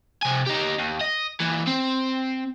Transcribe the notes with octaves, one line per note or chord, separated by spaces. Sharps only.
C3 G#5
D#4 G4
D#2
D#5
A#2 E3
C4